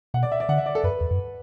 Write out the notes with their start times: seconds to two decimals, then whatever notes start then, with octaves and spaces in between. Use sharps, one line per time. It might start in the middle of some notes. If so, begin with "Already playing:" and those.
0.14 B2 F#5
0.23 D5
0.32 E5
0.40 D5
0.49 D3 F#5
0.58 E5
0.66 D5
0.75 A4
0.84 F#2 B4
1.01 E2
1.11 F#2